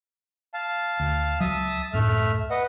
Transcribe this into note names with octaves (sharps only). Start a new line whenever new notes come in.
F5 A5
D2
C#2 F#3 E5 A5 D#6
C#2 F#2 A2 A3 E5 F6
B4 D#5 F#5